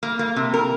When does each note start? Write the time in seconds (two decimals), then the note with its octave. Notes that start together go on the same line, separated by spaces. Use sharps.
0.03 A#3
0.19 A#3
0.36 C3
0.54 A#4